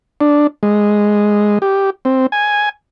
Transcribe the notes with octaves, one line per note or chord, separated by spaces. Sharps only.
D4
G#3
G4
C4
G#5